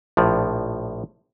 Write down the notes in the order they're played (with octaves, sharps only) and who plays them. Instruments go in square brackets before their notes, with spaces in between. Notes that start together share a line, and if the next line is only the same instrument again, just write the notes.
[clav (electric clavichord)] A#1 A2 F3